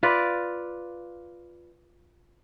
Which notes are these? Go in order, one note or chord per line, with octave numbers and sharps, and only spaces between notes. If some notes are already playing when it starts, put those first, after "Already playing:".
F4 B4 D5